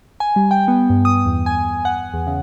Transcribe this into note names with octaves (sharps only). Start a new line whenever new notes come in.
G#5
G3
G5
B3
G2
D#6
E2
G#5
F#5
E2
C#3